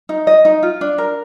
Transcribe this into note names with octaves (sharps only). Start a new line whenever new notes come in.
D#4
D#5
D#4
F4
D4
A#4